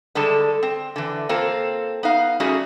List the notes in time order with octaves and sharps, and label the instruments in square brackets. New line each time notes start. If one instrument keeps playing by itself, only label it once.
[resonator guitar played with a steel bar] D3 G3 G#3 A4 A5
C4
D3 E3
A#3 C4 F4 A4
B3 D#4 F5
G3 A3 C#4 D#4 F#4 G#4